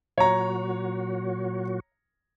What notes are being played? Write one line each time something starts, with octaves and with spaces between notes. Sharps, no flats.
A#2 F#3 F#4 C#5 A#5